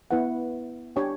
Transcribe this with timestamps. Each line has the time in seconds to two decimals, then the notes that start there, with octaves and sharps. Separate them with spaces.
0.11 B3 E4 B4 F#5
0.96 D4 G4 C#5 G5